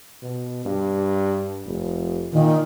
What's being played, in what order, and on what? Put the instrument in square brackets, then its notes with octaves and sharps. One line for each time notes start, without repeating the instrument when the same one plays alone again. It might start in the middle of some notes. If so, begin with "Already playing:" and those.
[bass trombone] B2
G2
F1
[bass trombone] A#2 [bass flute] D#3